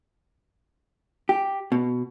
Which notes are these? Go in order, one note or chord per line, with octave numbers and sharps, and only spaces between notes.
G4
B2